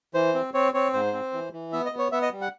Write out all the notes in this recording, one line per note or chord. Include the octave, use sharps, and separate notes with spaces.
E3 C5
C4
C4 C#5
C4 C#5
G#2 C5
C4
E3
E3
B3 E5
D#5
B3
C#5
B3 E5
D#5
G3
F#5